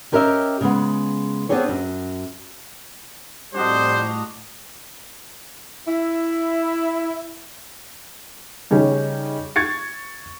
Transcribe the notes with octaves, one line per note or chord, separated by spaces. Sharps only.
C#4 G4 A#4 C#5 D#5 E5
C#3 G#3 B3
B3 C4 D4 G4 G#4 C#5
F#2
F2 A2 G3 D4 F#4 C5 D#5 A#5
E4 E5
C#3 G3 C#4 D#4
C#6 G#6 A6 C#7